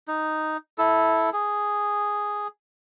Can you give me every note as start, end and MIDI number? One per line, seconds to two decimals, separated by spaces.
0.08 0.57 63
0.78 1.30 64
0.78 1.30 69
1.33 2.48 68